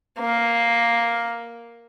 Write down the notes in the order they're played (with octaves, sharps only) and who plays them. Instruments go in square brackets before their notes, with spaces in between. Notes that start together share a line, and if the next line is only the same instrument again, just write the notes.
[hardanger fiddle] A#3